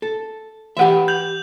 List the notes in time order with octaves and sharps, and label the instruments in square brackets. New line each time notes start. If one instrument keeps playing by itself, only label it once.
[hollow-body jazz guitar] A4
[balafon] E3 F#5 [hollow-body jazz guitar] G4 B4 E5
[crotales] G6 F7 F#7